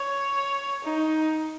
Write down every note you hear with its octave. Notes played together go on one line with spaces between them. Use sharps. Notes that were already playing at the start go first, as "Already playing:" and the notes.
Already playing: C#5
D#4